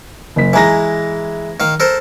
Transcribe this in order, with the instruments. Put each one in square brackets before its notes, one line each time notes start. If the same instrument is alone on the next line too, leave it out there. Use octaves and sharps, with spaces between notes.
[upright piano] F#1 B6
[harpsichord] E3 G#3 [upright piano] G#5 A#5 A#6
[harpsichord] D#3 F5
A4 A#4 C5